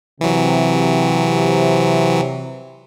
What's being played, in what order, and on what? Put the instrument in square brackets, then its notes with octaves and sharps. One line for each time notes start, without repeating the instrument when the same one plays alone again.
[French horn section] C3 [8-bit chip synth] E3 F#3